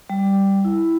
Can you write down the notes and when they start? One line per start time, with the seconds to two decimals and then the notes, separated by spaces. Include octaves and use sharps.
0.10 G3
0.65 E4